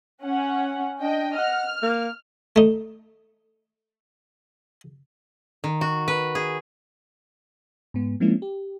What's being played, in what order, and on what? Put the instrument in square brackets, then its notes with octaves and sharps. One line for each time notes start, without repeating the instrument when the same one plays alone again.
[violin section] C#4 F#5
[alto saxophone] D4 [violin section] D#5 G5
[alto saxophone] F#5 [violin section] F6
[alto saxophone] A#3
[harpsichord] A3 D#4
[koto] D#3
F#4
B4
G#4
[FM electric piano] G#2 B3
F3 G#3 A#3 C4 C#4 E4
G4